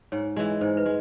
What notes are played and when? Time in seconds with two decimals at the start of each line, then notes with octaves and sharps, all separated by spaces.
0.12 G#2 C#5
0.36 E3 G#3
0.61 G#2 C5
0.77 B4
0.86 G#3